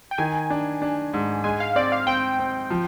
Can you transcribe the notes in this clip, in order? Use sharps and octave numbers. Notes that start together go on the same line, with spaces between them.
G5
D#3 G#5
D4
D4
G#2
G#3 G#5
F5
C4 D5
F5
C4 G5
C4
F3